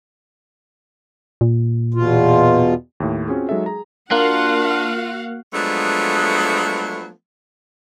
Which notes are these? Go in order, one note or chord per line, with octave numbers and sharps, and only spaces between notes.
A#2
E2 B2 F4
D#2 A2
C4 C#4 F4 F#4 G#4
F#3 G#3 D#4 A4 E5
G#4 A#5
A#3 D4 F4 F#4 F5 F#5 F#6
F3 F#3 G#3 A3 B3 D4